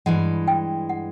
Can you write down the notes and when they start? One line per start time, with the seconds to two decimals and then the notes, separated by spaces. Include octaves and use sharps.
0.06 G2 E3 G#3 F#5
0.48 G5
0.89 F#5